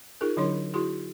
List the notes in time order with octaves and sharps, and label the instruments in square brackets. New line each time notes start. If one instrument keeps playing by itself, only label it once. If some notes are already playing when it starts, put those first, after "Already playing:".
[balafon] D#4 F4 G#4 A#4
D3 F#3 D4 E4 C#5 C6
E4 F#4 G#4 C6